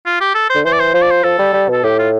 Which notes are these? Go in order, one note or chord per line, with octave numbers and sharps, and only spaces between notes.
F4
G4
A4
C5
D3
E3 C5
D5
C5
F3 C5
D5
C5
F3 A4
G3
G3
B2 A4
A2 G4
F4